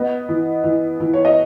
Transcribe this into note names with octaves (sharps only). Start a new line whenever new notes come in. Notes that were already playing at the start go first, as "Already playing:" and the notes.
Already playing: B3 D#5
E3
E3
E3
C#5
D#5